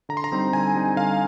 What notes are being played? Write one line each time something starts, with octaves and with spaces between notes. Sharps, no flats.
D3 A#5
C6
A#5
G3 C4 D#4
D3 G#5
G3 C4 D#4
D3 F5